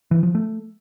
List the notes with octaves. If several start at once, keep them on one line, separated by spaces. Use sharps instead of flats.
E3
F3
A3